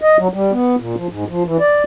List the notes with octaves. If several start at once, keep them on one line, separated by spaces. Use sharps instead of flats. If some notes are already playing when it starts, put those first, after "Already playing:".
D#5
F#3
G3
B3
A#2
F3
G#2
F3
E3
D5